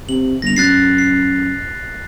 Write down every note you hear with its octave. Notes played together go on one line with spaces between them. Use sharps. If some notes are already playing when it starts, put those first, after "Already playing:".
C3 F#7
G1 A#6 F7
F#2 F#6 A6 C7
C7